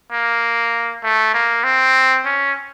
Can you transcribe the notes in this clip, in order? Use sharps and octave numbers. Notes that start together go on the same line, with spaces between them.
A#3
A3
A#3
C4
C#4